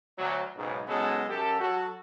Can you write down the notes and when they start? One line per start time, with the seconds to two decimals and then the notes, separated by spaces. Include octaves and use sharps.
0.18 D2 F#3
0.56 B1 G#2 C#3
0.87 C#3 F#3 G#3 B3 D#4 A4
1.30 F#2 G4 A4
1.60 F#3 F#4 A4